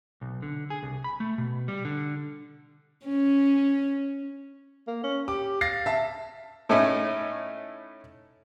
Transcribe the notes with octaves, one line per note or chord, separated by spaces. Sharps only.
B1
D3
G#4
C2
B5
A3
B2
G3
D3
C#4
A#3
C#4
G4 D6
F5 A6 A#6 C7
E5 A5
A2 A3 C#4 D#4 E4